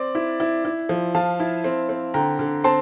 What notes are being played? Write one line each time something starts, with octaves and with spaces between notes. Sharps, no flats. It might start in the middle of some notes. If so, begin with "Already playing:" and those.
Already playing: C4 D5
E4
E4
E4
F3
F3 F5 A5
E4
C4
C4
D3 G5 A#5
D3
C4 A5 C6